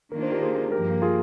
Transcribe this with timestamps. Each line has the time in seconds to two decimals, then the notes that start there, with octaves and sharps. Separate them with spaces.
0.12 D#3 A#3 D4 F4 A#4
0.23 C5
0.32 G4 A#4
0.42 G#4 C5
0.72 G2 F3 A#3 G4 A#4
1.02 F4 G#4